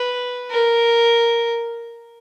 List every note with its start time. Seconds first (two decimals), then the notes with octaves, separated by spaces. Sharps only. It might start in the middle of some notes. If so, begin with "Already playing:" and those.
Already playing: B4
0.51 A#4